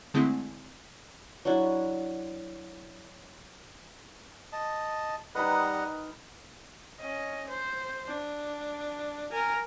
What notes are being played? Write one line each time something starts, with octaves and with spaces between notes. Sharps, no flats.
D3 G#3 A3 C4 E4
F#3 D4 E4
D#5 A5
D#3 G3 D#4 B4 D#5 F#5
C#4 D#5
C5
D4
A#4 G#5